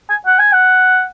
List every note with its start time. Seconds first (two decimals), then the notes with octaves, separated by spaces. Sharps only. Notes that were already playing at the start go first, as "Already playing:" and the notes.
0.10 G#5
0.26 F#5
0.39 G#5
0.53 F#5